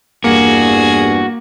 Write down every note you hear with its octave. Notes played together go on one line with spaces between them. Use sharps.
E2 G2 A#3 F#4 G#4